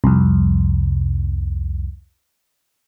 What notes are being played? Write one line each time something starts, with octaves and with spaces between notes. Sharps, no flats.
C2 F2